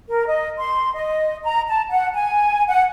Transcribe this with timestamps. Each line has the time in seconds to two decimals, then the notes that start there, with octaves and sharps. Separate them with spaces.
0.09 A#4
0.26 D#5
0.58 C6
0.95 D#5
1.43 A#5
1.68 A5
1.90 F#5
2.14 G#5
2.68 F#5